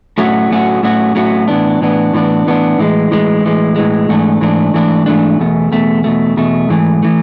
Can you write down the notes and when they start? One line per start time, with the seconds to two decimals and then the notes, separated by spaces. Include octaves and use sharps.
0.18 A2 F#3 A3 C#4 F#4
0.50 A2 F#3 A3 C#4 F#4
0.83 A2 F#3 A3 C#4 F#4
1.15 A2 F#3 A3 C#4 F#4
1.48 A2 E3 B3 D4
1.81 A2 E3 B3 D4
2.14 A2 E3 B3 D4
2.47 A2 E3 B3 D4
2.78 A2 E3 G#3
3.11 A2 E3 G#3
3.44 A2 E3 G#3
3.76 A2 E3 G#3
4.09 G#2 E3 A3 D4
4.41 G#2 E3 A3 D4
4.73 G#2 E3 A3 D4
5.06 G#2 E3 A3 D4
5.40 E2 B2 A3
5.72 E2 B2 A3
6.04 E2 B2 A3
6.37 E2 B2 A3
6.69 G#2 E3 A3
7.02 E3 A3